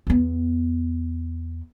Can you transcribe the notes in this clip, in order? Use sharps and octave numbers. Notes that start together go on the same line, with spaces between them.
E2 B3